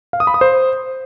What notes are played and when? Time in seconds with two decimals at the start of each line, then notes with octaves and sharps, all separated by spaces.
0.13 F5
0.20 D#6
0.27 B5
0.34 D#6
0.41 C5